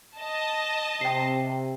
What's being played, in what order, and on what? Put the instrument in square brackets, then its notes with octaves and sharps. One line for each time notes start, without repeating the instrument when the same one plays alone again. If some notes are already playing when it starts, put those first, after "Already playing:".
[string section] D#5 A5
[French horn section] C3 [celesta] G5 C7